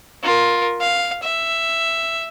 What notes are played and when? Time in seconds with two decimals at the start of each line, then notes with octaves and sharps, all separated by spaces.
0.24 F4 A#4
0.81 F5
1.23 E5